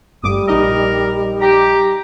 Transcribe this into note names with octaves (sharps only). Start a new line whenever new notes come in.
G1 D2 G3 D6 D#6
A#1 D#4 A#4 D#5
G4 A#5